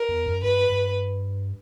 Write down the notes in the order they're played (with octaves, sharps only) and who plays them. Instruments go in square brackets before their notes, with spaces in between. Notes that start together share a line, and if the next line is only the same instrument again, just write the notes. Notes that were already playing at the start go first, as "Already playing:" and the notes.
Already playing: [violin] A#4
[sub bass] E2
F#2
[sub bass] G2 [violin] B4
[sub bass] G2